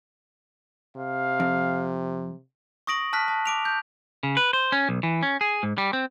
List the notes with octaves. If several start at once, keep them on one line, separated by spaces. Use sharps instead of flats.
C3 F5
F2
C#6 D#6 A#6 D7 F#7
A5 F6 F#6 B6
A5
D6 D7 F7
G6
C#3
B4
C5
C#4
B1
E3
C#4
G#4
G#2
G3
C4